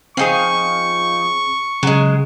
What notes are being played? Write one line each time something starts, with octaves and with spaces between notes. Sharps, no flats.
F3 C4 D#4 G#4 F5 C#6
C#3 F#3 G#3